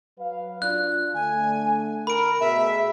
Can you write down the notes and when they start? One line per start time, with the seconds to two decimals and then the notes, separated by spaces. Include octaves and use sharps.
0.19 F#3 B4 F5
0.62 D4 F4 D5 F#6
1.15 D3 A3 G#5
2.07 A#4 B5 D7
2.40 B2 A3 G#4 E5